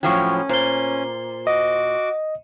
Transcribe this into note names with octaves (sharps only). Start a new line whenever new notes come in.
A2 F3 F#3 C#4 G5 C#6
A#2 C5 C7 G7
F#4 D#5 D6